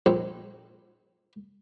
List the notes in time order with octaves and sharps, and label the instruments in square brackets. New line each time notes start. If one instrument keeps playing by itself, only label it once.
[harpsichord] A#1 C4